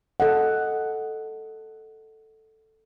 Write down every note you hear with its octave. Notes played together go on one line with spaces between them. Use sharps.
A4 D#5 F#5